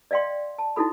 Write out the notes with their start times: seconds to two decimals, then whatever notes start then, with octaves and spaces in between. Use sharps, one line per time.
0.11 D5 D#5 F5 G5 C6
0.59 A5
0.76 D#4 E4 F#4 A4 B5